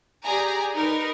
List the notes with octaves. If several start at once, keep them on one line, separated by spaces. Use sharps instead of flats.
G4 G#4 D5 G#5 A#5
D#4 A#4 B4